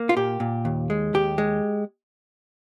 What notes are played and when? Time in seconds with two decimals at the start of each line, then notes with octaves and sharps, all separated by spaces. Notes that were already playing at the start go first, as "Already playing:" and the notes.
Already playing: A#3
0.09 F4
0.16 A#2 G4
0.40 A#2
0.65 D#2
0.90 G#3
1.14 D#2 G4
1.38 G#3